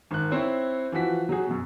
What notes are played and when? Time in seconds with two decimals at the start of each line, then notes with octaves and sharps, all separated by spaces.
0.11 G#1 F#6
0.31 C4 E4 C5 C#5
0.92 E3 F3 F#4 B6
1.29 F#3 F#4 G#4
1.46 F#2 B2